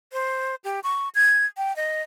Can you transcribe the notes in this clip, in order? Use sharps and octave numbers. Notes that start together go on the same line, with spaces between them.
C5
G4
C#6
G#6
G5
D#5